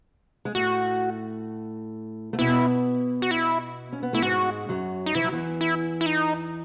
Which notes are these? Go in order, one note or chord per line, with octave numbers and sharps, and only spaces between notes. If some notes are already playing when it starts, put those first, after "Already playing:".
G#3
A2 A3 F#4
A3
B2 B3 E4
F#4
E4
C#4
B3
A3 E4
G#2 G#3 F#4
F#2 F#3
D#4
E3 E4
F#3
E2 E3
E4
E4
D#4